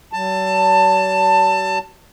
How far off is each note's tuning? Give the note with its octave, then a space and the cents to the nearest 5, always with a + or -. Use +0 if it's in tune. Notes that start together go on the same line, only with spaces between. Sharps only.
F#3 +45 A5 +20